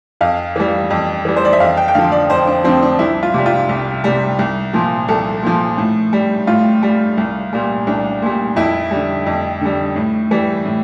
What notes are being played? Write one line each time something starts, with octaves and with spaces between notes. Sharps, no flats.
F2 F5
E3 G3
F2
E3 G3
C5
D5
E5
F2 F5
G5
G5
D3 F3 F5
D5
F2 C5
D4
D3 F3 C4
D4
C2 E4
F4
C3 G3
F4
C2
C3 G3
C2
A#2 F3
C2 A4
A#2 F3
A2
G3
A2 F4
G3
C2
A#2 G3
C2 D4
A#2 G3
F2 E4
D3 G3
F2
D3 G3
A2
E3 G3
A2